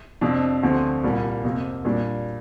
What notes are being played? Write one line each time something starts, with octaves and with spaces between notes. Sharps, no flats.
F2 C3 F3 D4
D2 D3 F3 C4
C2 A#2 G3 A#3
F2 C3 A#3
A#2 G3 D4